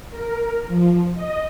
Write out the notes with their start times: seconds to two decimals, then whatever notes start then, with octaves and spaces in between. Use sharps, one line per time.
0.10 A#4
0.68 F3
1.14 D#5